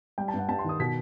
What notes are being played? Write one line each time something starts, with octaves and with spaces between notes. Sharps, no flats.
G3 G5
A5
G2
F#5
G2 A5
C6
D#3 D#6
B2 B6